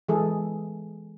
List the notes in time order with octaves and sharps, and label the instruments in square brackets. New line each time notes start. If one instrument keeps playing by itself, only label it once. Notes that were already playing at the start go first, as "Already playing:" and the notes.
[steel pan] E3 G#3 G#4 A4